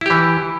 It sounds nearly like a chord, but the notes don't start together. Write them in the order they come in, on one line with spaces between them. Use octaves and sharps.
E4 G4 E3